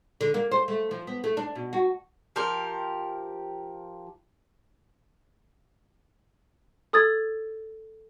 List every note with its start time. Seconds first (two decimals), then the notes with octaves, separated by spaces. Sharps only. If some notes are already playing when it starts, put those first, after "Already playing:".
0.21 D3
0.34 A#3
0.52 C5
0.68 A3
0.91 F3
1.07 B3
1.24 A3
1.37 D4
1.55 B2
1.73 F#4
2.36 F3 G4 A#4
6.93 A4 D#6 G#6 A6